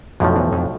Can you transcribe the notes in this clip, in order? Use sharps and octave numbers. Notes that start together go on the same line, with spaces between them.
B1 F2 A2 F3
E2
F2